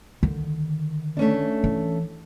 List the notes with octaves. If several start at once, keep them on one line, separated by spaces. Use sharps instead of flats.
D3 D#3
A3 C#4 D4
E3